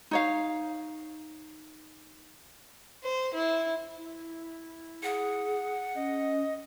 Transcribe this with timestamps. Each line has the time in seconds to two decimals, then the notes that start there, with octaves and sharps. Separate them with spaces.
0.11 D#4 C#5 F5
3.04 C5
3.34 E4
3.97 E4
5.03 G#4 F#5
5.95 C#4 D#5